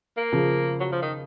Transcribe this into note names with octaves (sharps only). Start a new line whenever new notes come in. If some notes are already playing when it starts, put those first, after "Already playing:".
A#3
C#3 F3
F#3
F3
D#3